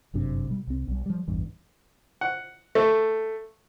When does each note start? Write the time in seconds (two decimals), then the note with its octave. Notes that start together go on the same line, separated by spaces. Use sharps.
0.14 G1 F#2 C3 D4
0.48 B2 G3
0.67 C2 C4
0.88 B1 G3
1.06 F3 G3
1.28 A1 E2 G2 E3
2.21 F#5
2.75 A3